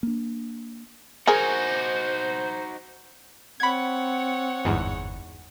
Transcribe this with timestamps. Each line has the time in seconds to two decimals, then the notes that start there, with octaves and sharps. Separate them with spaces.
0.03 A#3 D4
1.27 D#4 F#4 G#4 A#4 C5 G#5
3.60 C4 C#5 F#5 B5 G#6
4.65 G1 E2 G#2